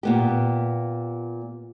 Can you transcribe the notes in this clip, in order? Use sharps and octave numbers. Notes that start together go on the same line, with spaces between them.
A#2 B3 G4